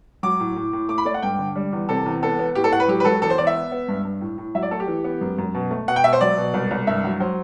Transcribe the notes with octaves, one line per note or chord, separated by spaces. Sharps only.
F#3 D6
A2
A2
A2
A3 D6
B5
A3 D5
F#5
G2 G5
D3
G3
E2
C3 A4
E2
B3 A4
B3
A2 G4
A4
A2 F#5
B4
F#3 G4
B4
F#3 A4
E2 A4
C5
E2 D5
E5
B3
B3
G2
G2
A2
A2
F#3 E5
D5
A3 A4
G4
E3
B3
F#2
F#2
B2
A3
B2 F#5
G5
B2 E5
C5
F#3 D5
B2
C2
C2
G2 E5
F#3
F#3 C5